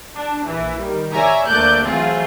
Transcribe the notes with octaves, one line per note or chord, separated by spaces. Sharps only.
D4
A#1 E3
D#3 G3
C#5 D5 E5 G#5 A#5
D2 A3 A#3 D5 F#6 G6
E3 F#3 A3 C4 F4 G#4